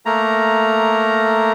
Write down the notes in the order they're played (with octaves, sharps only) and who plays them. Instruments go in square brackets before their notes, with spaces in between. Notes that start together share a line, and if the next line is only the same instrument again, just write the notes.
[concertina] A3 A#3 A#5